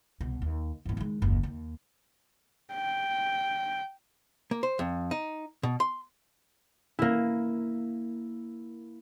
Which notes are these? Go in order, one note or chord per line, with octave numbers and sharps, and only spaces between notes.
C2 B2
D#2
E2 G#2
D#3 G#3
F#1 D#2
D#2
G5
A#3
C5
F2
D#4
B2
C6
A#3 E4